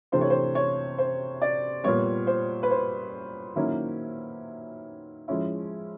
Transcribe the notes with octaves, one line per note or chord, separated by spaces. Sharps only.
C3 E3 A3 D4 C5
C#5
C5
C#5
C5
D5
A#2 G3 B3 C#5
C5
B4
C5
D#3 F#3 A#3 C#4 E4
F3 G#3 C#4 E4